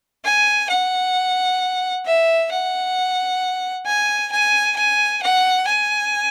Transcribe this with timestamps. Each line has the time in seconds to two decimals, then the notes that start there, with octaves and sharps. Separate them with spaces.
0.24 G#5
0.69 F#5
2.05 E5
2.51 F#5
3.86 G#5
4.32 G#5
4.76 G#5
5.23 F#5
5.67 G#5